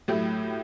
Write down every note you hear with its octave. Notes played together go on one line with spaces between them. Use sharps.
A2 F#3 A3 E4 G4